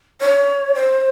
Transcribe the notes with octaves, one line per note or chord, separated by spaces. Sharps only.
C#5
C5